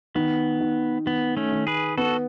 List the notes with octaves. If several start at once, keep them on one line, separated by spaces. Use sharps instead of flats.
D#3 B3
D#3
D#3 B3
A3 C#4
D#3
G#4 B4
B3 F#4 A4